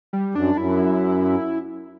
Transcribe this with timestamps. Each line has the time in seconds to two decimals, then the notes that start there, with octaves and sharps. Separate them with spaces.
0.13 G3
0.35 F#2 D4
0.57 F#2 E4